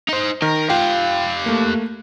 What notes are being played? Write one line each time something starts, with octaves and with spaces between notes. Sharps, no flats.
D#4 C5
D#3 A#4
F4 G4 F5 G5
A3 A#3